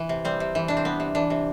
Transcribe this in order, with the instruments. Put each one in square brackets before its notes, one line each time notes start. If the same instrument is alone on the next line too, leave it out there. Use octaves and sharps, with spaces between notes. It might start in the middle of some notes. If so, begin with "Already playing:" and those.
Already playing: [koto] E3
C3
G3 C4
C3
E3
C3 D4
C4
G3 B3
C3
E3 D4
C3